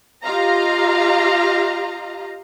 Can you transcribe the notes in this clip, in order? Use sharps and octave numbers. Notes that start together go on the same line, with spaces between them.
F4 G4 D#5 F5 A#5